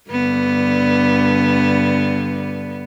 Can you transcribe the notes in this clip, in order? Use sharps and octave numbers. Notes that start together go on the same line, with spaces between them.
G2 D3 B3